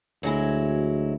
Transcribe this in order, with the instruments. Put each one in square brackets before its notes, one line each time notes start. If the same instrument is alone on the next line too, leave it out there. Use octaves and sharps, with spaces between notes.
[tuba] D2 [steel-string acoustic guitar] F#3 G#3 E4